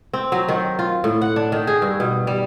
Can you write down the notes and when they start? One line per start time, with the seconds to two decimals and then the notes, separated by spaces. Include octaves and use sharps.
0.13 C4
0.32 F#3
0.49 D#3
0.79 F4
1.04 A2
1.22 F#5
1.36 D4
1.52 D#3
1.67 G#4
1.82 G2
2.00 B2
2.27 G3